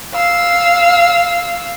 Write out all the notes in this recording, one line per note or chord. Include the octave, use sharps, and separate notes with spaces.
F5 E6